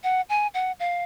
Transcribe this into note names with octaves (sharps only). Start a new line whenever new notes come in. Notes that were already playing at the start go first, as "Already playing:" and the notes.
F#5
G#5
F#5
F5